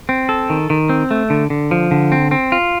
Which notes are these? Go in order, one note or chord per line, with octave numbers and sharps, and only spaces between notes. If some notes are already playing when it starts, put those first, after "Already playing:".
C4
A4
D#3
D#3
C4
A3
D3
D3
F3
D3
C4
C4
F4